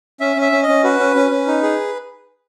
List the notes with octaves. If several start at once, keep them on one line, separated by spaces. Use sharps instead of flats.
C#4 E5
C#4
E5
C#4
D#5
C#4
F#4 B4
C#4
C#4
C#4
D#4
G#4